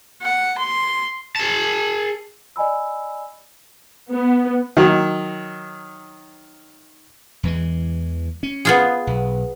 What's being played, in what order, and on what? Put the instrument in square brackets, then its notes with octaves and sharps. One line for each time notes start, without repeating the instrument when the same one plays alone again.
[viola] F#5
C6
[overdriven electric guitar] G#4 A5
[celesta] D5 D#5 G#5 B5 E6
[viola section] B3
[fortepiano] D#3 F#3
[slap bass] E2 E3 G#3
C#4
[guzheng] B3 F4 G#4
[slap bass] B1